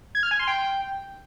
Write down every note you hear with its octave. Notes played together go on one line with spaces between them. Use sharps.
G#6
F6
G#5
C6
G5